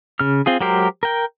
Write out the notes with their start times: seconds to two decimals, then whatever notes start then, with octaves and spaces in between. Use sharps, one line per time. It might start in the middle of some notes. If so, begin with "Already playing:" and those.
0.20 C#3 F6
0.46 C4 F4 G#4
0.61 F#3 G#3 G4 A#4 C5
1.03 A#4 G5